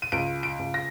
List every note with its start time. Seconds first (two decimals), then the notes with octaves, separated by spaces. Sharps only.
0.02 D#7
0.12 C#2 D7
0.43 D7
0.59 C#2
0.74 A#6